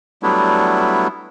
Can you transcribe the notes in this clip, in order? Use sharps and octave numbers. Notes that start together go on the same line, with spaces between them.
F#3 G3 A3 B3 D4 E4